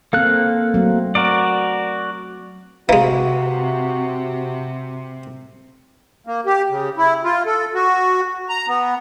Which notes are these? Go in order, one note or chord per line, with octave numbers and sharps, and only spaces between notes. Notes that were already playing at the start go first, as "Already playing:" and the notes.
A#3 C4 A4 F5 F#6
F#3 A3 C4
F#4 A#4 D5
C3 E3 G#3 F#4 B4 F5 A#5
A#3
G4
C#3
E4
F4
A4
F#4
A#5
B3